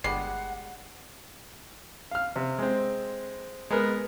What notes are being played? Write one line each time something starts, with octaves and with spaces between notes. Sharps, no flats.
G1 G3 G#3 F#5 C7
F5 F6
C3
G#3 C4
G#3 B3 A#4